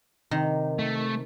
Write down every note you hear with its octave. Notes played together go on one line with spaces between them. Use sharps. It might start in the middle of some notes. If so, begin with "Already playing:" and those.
C3 D#3
A3